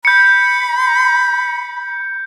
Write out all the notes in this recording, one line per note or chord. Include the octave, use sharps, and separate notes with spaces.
B5 G6 C#7